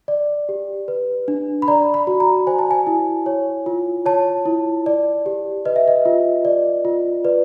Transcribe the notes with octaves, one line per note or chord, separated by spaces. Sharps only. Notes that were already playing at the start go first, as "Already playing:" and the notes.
D5
G4
B4
D4
B5
D5 A#5
B5
F#4
A#5
C5 G#5
A5
G#5
E4
C#5
F4
C#5 A5
E4
D5
G4
B4 D#5
E5
D#5
F4
D5
F4
B4 D5